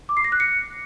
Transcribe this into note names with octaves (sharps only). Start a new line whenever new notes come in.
D6
C7
A#6
F#6
C#7